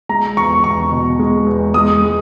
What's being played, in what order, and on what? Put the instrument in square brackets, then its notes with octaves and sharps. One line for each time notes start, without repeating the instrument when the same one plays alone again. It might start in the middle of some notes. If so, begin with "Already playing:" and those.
[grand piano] G#3 A#5
E2 C#6
E2 C#6
B2
G#3
E2
G#3 D#6
G#3